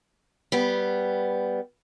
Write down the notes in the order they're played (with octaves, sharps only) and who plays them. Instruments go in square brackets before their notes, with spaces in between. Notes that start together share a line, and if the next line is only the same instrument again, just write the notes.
[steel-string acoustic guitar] G3 B3